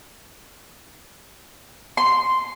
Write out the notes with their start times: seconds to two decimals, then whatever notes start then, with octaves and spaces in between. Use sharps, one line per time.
1.97 C6